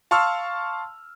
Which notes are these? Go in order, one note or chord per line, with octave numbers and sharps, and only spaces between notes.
F5 A5 C6 C#6 E6 F6